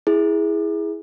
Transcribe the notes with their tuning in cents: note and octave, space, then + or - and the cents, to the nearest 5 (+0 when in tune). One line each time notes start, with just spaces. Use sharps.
E4 -5 G#4 +0